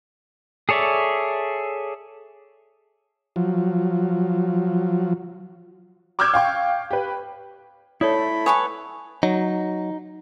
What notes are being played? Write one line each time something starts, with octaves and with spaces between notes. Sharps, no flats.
G#4 A4 C#5 D5 E5
F3 F#3
C#6 D6 E6 F6 G6 G#6
F5 G5 C#6
G4 B4
A3 E4 A4 C#5 D5 B5 D#6
A4 B4 C#5 F#5 G#5 D#6
F#3 D#4